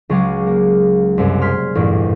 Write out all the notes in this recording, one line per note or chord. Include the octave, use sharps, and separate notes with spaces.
C#2 F#3 G#4 F5 D6
A#3
C2 F#2
C6 F6 G#6 B6
A1 E2 G2 A#2